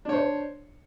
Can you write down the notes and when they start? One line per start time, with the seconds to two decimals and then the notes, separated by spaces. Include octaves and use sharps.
0.05 D4
0.09 C#5
0.13 C5